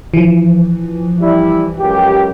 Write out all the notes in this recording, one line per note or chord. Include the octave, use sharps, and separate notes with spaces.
E3 F3
G3 E4
C#2 F#2 G4